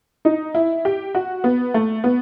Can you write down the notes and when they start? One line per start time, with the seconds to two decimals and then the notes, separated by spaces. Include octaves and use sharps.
0.25 D#4
0.55 E4
0.85 G4
1.15 F#4
1.44 B3
1.74 A3
2.04 B3